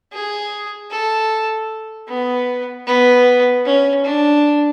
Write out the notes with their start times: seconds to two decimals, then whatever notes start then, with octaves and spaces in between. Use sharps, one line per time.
0.13 G#4
0.90 A4
2.08 B3
2.86 B3
3.65 C#4
4.04 D4